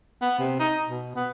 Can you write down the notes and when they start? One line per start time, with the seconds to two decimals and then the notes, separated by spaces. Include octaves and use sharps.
0.21 B3
0.39 C3
0.60 D#4
0.89 B2
1.16 B3